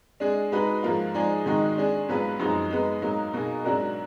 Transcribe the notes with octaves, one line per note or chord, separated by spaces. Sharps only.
G#3 D4 G#4
G#3 D#4 F#4 B4
G#2 F3 A#3 F4
F3 G#3 D#4 G#4 D5
G#2 D#3 G#3 D#4 F#4
G#3 D4 G#4
G#2 F#3 B3 F4 B4
F#2 F3 G#3 D#4 F#4
G#3 B3 D#4
G#2 F#3 A#3 D#4
B2 A#3 D#4 G#4
G#2 F#3 D4 F#4 A#4